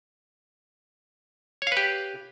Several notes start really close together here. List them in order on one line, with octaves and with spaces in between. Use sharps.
C#5 F5 B4 G4